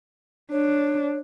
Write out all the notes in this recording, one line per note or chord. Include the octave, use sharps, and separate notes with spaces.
D4 C#5